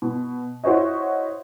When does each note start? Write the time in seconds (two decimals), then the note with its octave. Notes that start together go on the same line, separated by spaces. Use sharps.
0.02 B2
0.64 E4 F#4 C5 C#5 D#5